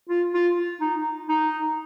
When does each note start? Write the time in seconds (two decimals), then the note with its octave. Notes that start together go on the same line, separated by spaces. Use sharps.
0.09 F4
0.34 F4
0.81 D#4
1.29 D#4